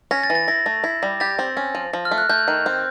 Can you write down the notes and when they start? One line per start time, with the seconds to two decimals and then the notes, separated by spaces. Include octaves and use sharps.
0.11 C#4 A#6
0.23 A6
0.30 E3
0.35 A6
0.48 E4 A#6
0.66 A3
0.84 E4
1.03 G3
1.20 G4 A6
1.39 C4
1.57 C#4
1.75 F3
1.93 F3
2.05 F6
2.11 A3
2.18 F#6
2.29 A3 G6
2.48 D#3
2.66 C4